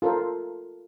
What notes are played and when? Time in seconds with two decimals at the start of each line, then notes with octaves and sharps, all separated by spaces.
0.02 F4 A4 A#4 C5